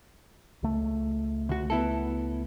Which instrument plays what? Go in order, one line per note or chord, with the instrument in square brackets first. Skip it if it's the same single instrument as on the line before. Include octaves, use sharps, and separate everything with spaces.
[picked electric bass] C#2 A3
[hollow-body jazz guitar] D2 F#4
B3 E4 A4